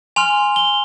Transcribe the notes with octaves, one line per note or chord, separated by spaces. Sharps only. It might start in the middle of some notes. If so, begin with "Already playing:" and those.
G#5 C6 F6 F7
G7